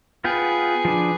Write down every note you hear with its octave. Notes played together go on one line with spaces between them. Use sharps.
B3 F4 G#4 B4 G5
F3 D4